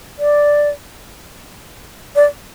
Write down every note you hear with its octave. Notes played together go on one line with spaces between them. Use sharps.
D5
D5